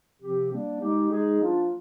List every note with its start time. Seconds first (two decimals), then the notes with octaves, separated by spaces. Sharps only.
0.21 C3 F3 C4 G4
0.52 G3 A#3 D4
0.81 G#3 D#4 G4
1.11 G#3 D#4 G#4
1.40 F3 A#3 D4 F4